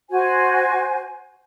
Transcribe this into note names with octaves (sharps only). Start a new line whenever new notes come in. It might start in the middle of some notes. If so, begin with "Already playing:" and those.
F#4 C5 G#5